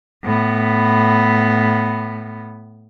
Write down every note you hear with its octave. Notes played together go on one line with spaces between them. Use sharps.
A2 B3